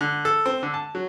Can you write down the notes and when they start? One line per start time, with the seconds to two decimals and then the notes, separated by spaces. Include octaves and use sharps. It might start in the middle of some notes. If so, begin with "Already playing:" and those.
0.01 D3
0.25 A4
0.46 C4
0.63 D3
0.74 A5
0.95 F#3